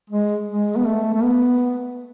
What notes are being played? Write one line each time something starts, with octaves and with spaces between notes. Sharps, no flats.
G#3
G#3
B3
A3
A3
B3